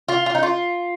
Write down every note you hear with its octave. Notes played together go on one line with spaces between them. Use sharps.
F4
F4
D#4
F4